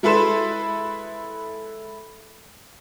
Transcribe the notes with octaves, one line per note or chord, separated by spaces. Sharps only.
G#3 E4 A4 B4 C6 E7